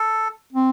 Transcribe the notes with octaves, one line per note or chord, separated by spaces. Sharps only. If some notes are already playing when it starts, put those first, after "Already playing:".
Already playing: A4
C4